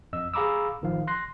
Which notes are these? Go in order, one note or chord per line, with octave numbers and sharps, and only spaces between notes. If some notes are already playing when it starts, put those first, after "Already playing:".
F2 D#5 E6
G#4 F5 A#5 B5 D6 E6
A1 D#3 F3 F5
C6 F#6 A#6 C7